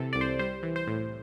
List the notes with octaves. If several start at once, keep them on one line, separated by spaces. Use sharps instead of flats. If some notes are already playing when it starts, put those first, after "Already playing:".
Already playing: C3 E3 A4
C2 D5
C5
G3 C5
E3
C5
A2